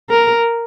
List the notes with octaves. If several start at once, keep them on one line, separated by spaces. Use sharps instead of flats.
A#4